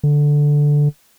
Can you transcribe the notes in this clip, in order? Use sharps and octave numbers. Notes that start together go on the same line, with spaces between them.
D3